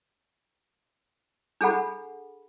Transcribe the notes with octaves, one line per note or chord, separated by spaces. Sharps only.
D4 G#4 A4 F#5 B5